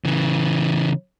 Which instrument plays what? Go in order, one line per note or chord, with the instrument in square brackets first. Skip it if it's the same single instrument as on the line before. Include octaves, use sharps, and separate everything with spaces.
[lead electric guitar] C#3 E3